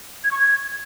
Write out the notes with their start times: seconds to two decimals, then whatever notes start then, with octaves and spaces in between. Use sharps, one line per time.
0.24 G#6
0.31 C#6
0.39 G#6